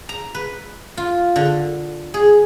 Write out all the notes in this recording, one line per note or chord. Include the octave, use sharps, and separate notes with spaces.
A#5
B4
F4
D3
G#4